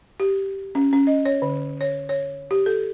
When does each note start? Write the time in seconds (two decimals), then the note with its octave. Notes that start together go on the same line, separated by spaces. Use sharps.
0.20 G4
0.75 C#4
0.93 C#4
1.07 D#5
1.25 C#5
1.42 D3
1.81 C#5
2.09 C#5
2.51 G4
2.66 A4